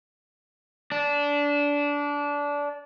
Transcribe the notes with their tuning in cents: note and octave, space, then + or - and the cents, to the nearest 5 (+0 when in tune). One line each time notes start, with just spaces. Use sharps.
D4 -20